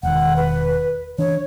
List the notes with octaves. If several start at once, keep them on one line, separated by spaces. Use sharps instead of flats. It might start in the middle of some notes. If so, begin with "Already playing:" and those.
E1 D#3 F#5
B4
E3 D4 C#5